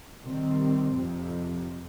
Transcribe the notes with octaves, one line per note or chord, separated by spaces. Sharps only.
C3 D#3 G3 C4
F2 C3 F3